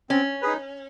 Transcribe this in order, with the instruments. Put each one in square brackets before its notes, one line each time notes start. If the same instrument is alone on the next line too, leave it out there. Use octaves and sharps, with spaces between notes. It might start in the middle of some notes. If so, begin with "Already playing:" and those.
[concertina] C4 [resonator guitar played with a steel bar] C#4
[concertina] D#4 G#4 B4